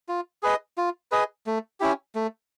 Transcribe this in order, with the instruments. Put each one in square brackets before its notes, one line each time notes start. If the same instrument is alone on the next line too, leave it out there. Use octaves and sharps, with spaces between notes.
[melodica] F4
G#4 B4 D#5
F4
G#4 B4 D#5
A3
C#4 E4 G4
A3